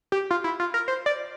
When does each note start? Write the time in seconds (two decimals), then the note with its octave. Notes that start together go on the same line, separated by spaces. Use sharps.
0.12 G4
0.31 F4
0.44 E4
0.60 F4
0.74 A#4
0.88 C5
1.06 D5